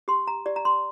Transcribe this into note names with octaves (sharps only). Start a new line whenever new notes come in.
G4 C6
A#5
G4 D5
A#5
C6